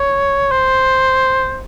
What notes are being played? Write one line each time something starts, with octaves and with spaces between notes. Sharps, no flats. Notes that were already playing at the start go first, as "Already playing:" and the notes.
Already playing: C#5
C5